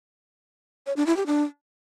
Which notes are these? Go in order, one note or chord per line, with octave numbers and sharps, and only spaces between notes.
C#5
D4
E4
G4
D4